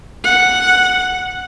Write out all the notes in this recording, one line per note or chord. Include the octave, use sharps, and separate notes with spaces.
F#5